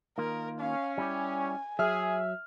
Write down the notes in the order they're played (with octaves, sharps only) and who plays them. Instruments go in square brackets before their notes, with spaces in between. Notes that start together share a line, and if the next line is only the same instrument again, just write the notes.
[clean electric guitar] D#3 A#3 F4 [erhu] A#4
[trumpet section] C#4 [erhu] F5
[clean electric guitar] G3 E4 G4 [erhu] G#5
[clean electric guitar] F#3 [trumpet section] G#4 [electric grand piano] E5 F6